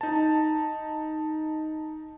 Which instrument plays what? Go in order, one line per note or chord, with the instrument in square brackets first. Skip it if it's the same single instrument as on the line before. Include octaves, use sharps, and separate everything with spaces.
[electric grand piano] D#4 A5